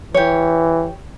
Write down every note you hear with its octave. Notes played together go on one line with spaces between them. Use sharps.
E3 G4 C#5